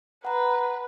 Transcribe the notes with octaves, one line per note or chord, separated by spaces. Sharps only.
B4 F#5 A#5